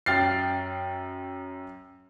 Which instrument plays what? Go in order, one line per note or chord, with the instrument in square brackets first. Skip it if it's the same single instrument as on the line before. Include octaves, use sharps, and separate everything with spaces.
[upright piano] F#2 G5 F6 A6 C7